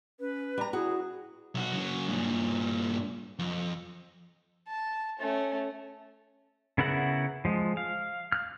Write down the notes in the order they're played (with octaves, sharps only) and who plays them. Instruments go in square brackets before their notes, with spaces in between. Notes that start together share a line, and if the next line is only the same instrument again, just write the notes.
[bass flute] C#4 [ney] B4
[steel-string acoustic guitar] G3 A#5
[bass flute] E4 [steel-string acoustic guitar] F#4 [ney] G#4
[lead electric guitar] B1 F#4
C#3 F#3
G2 A#2
F2
[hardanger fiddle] A5
A3 C#4
[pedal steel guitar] C#3 B3 E4 A#4 F#5
F3 G#3
F5
F6 F#6